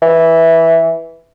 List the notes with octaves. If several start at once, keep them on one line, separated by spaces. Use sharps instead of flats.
E3